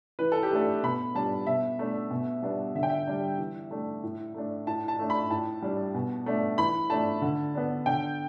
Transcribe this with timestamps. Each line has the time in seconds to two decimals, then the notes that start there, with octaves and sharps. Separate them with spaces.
0.19 E3 B4
0.32 A4
0.43 G4
0.51 A3 D4 A4
0.83 B2 B5
1.15 G3 D4 A5
1.47 B2 E5
1.79 A3 D4
2.11 B2
2.42 G3 B3 D4
2.75 D3 E5
2.83 G5
2.90 E5
3.07 G3 D4
3.38 E3
3.71 A3 D4
4.03 A2
4.34 A3 D4
4.67 A2 A5
4.88 A5
4.99 A3 D4
5.10 B5
5.30 A2 A5
5.62 G3 D4
5.94 B2
6.26 A3 D4
6.58 E3 B5
6.90 A3 D4 A5
7.22 D3
7.55 B3 D4
7.86 D3 G5